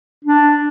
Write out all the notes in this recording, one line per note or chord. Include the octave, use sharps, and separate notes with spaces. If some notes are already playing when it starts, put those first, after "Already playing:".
D4